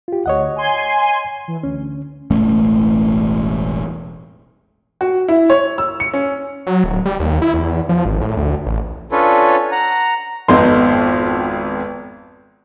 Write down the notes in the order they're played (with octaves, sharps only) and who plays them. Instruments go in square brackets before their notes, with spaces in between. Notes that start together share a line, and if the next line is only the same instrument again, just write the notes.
[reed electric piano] F4 G4
[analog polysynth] D2 [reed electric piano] C#5 D#5 F#5
[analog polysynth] G#5 C6
E3
[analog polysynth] D2 [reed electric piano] C#4
[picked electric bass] E1 A1 A3 C#4
[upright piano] F#4
E4
C#5
E6
C#7
C#4
[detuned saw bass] F#3
D1
G3
D#2
E4
E2
F3
G#1
A2
D2
A1
[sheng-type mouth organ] C#4 D4 F4 A4 B4 C#5
F#5 A#5
[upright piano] G#1 F2 B3 D#4 A4 C6